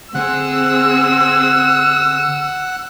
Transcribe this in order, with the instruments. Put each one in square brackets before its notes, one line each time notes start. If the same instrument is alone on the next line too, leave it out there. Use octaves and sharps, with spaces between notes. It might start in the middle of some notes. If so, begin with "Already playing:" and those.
[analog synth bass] D3 [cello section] C4 G#4 [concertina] F#5 F#6 [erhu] E6